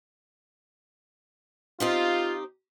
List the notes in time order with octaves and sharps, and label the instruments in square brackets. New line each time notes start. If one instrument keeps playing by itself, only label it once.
[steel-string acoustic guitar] C4 D#4 G4 [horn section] F4